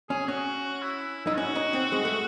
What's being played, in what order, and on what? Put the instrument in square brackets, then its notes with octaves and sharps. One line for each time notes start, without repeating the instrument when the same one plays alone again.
[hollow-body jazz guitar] C#4 [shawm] G#4
[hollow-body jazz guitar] C#4 [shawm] F#4
[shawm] E4
[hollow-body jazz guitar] D#4 [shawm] E4
[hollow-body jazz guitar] C#4 [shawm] F#4
[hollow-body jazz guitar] D#4
C4
G#3
A3